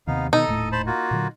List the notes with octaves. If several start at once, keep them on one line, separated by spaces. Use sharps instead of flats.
D#2 C3 B3 D#4 F5
B2 D#3 D#4 A4 D#5
D#1 A2 A3
C5 A5 B5
A#3 F4 F#4
A#2 D3 F#3